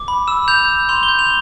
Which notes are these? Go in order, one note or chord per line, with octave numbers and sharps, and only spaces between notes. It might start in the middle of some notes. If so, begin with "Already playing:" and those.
Already playing: D6
B5
E6 E7
G6 F7
E6
C6 F7
G7
G6
F7